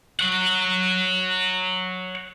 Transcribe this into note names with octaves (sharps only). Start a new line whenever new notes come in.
C#5 F#5